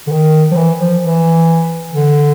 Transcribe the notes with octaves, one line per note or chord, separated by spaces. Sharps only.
D3
D#3
F3
E3
F3
E3
D3